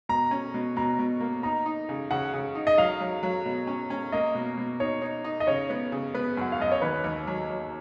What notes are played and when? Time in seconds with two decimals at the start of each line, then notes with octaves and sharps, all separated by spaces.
0.09 B2 A#5
0.31 C#4
0.54 B2
0.76 B2 A#5
0.99 B2
1.21 A#3
1.43 D#4 A#5
1.66 D#4
1.89 C#3
2.11 C#3 F#5
2.34 C#3
2.55 D#4
2.67 D#5
2.78 F#3 F5
3.00 F#3
3.23 F#3
3.46 B2
3.67 C#4
3.90 C#4
4.12 A#3 D#5
4.35 B2
4.57 B2
4.80 D#4 C#5
5.02 D#4
5.24 D#4
5.40 D#5
5.47 C#3 C#5
5.70 B3
5.92 C#3
6.14 B3 B4
6.37 F#2 F#5
6.52 F5
6.59 F#2 D#5
6.72 C#5
6.82 D#2 B4
7.04 D#2
7.27 F#3
7.49 F#3